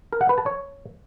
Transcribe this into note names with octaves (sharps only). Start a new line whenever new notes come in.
A#4
F#5
B4
A5
C#5